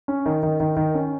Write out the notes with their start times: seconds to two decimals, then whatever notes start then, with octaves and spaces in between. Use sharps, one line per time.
0.08 C#4
0.26 D#3
0.43 D#3
0.60 D#3
0.77 D#3
0.95 C#4